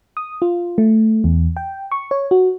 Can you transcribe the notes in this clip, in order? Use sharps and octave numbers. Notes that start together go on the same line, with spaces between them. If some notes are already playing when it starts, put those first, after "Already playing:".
D#6
F4
A3
E2
G5
C#6
C#5
F#4